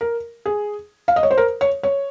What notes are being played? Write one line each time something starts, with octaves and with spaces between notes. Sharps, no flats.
A#4
G#4
F5
D#5
C#5
C5
A#4
C#5
C#5